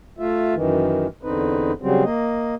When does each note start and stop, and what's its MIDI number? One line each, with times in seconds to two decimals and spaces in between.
0.19 0.55 57
0.19 0.55 65
0.19 0.55 76
0.55 1.07 42
0.55 1.07 51
0.55 1.07 52
1.23 1.72 40
1.23 1.72 50
1.23 1.72 60
1.23 1.72 63
1.23 1.72 71
1.82 2.04 49
1.82 2.04 54
1.82 2.04 55
1.82 2.04 60
2.04 2.55 58
2.04 2.55 75